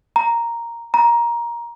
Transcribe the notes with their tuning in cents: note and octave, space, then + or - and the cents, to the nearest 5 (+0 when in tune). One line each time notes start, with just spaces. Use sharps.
A#5 +0
A#5 +15